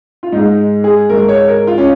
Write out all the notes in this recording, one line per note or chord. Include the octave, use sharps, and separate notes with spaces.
F4
G#2 G#3 D#4
G#4
G#2 G#3 A#4
C#5
A#4
F4
C#4